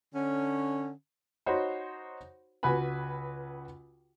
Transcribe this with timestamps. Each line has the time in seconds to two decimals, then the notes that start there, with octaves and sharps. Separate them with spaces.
0.15 D3 C#4
1.46 D#4 F#4 C5 C#5 B5 C6
2.63 C#2 F#4 B4 G#5 B5